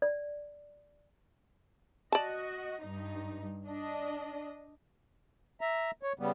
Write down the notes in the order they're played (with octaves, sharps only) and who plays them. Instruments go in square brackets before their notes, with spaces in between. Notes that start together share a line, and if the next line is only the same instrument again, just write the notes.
[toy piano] D5
[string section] F#4 D#5 [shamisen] D5 A5
[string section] G2 D#4
D4 D#5
[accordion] E5 A#5
C#5
C#3 G3 B3